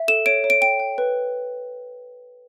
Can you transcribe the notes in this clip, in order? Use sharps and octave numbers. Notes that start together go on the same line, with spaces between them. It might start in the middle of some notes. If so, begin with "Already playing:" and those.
Already playing: E5
A4 E7
C#5 D7
C#5
D7
G5 D7
G5
B4